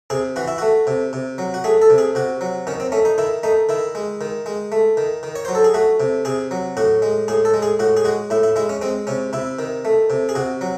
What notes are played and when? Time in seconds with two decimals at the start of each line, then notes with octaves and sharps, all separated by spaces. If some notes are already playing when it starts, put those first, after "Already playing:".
0.10 C3 G#4
0.36 E3 F#4
0.48 E4
0.58 A3 F#4
0.87 C3
1.13 C3
1.38 F#3
1.54 F#4
1.64 A3 G#4
1.82 A4
1.90 C3
1.98 G#4
2.15 C3 F#4
2.41 F#3
2.67 D#3 C#4
2.80 C4
2.92 A3 C#4
3.05 D#4
3.18 D#3 E4
3.43 A3 D#4
3.69 D#3 E4
3.95 G#3
4.21 D#3
4.46 G#3
4.72 A3
4.97 D#3
5.23 D#3
5.35 C#5
5.45 F#3 C5
5.55 A4
5.64 G#4
5.74 A3 F#4
6.00 C3
6.25 C3 G#4
6.51 F#3
6.77 A2 F#4
7.02 G#3
7.28 A2 G#4
7.45 A4
7.54 G#3
7.62 G#4
7.79 A2 F#4
7.97 G#4
8.05 G#3 F#4
8.30 A2 E4
8.43 E4
8.56 G#3 E4
8.69 C#4
8.82 G#3 C4
9.07 C3 C#4
9.33 C3 E4
9.59 D#3
9.85 A3
10.10 C3
10.29 G#4
10.35 C3 F#4
10.61 F#3